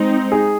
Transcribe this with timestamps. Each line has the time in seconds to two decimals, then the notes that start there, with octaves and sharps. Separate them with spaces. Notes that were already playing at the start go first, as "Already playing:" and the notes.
Already playing: G#3 C4 D#4
0.32 G#4